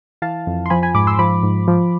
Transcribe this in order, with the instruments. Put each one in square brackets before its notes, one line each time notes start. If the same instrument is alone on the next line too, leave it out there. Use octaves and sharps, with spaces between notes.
[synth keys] E3 F5 A5
F2
C6
F3 G#5 B5
G#5 B5
G#2 B5 D6
C6 E6
F3 B5 D6
G#2
F3